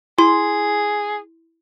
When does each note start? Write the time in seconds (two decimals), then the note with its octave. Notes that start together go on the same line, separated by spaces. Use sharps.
0.18 E4 G#4 C6